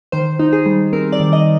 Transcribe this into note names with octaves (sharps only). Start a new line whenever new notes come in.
D#3 C5
D#4
G#4
G3
C4 A#4
D5
D#3
D#5